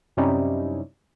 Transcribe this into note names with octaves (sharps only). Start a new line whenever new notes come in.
F#2 C3 G3 C#4 D#4 E4